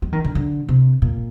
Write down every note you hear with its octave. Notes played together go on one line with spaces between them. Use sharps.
G#3
D#3
D3
D3
C3
A#2